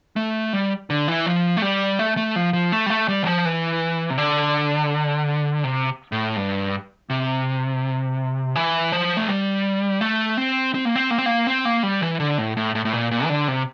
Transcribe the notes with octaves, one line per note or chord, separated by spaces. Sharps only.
A3
G3
D3
E3
F3
A3
G3
A3
A3
F3
F3
A3
G3
A3
G3
E3
F3
E3
C3
D3
C3
A2
G2
C3
E3
F3
A3
G3
A3
C4
C4
A#3
C4
A#3
C4
A#3
C4
A#3
G3
E3
D3
A2
A2
A2
A2
A#2
A#2
E3
D3
C3